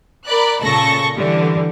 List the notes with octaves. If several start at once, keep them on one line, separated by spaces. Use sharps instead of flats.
A#4 D5 B5 F#6
A#2 C#3 A4 A5 C#6 A#6
D3 E3 G3